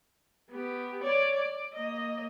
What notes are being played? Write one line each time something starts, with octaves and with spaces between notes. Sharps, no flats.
B3 G4
C#5 D5
D5
A#3 D#5